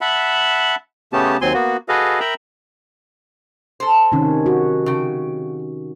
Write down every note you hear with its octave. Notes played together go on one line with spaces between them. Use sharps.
E5 F#5 A5 B5
C#3 A3 B3 C#4 G4 A5
D#2 F#3 C4 G#5 C6
A#3 B3 F#4
F#4 G#4 A4 B4 D#5 F5
A#4 E5 G5 A#5 B5
A4 C5
C3 D#3 C#4
F#4
C#3 G5